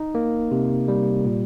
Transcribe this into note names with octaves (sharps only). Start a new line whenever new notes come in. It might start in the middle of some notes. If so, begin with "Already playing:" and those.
Already playing: D#4
A#3
C3
G3
A#2